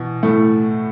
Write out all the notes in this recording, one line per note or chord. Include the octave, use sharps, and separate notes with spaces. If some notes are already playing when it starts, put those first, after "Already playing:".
Already playing: B2 E3
A2 A3